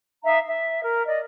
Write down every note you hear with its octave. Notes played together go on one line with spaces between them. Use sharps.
D#4 E5 F5 A#5
E5
A#4
D5 D#5